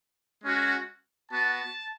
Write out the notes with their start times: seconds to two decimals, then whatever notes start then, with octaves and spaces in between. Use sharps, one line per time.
0.44 G#3 C#4 F#4
1.31 B3 F#4 A5